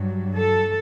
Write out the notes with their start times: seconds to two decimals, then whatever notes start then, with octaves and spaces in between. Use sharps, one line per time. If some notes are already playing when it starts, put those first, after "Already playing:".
Already playing: G2 F#3
0.37 A4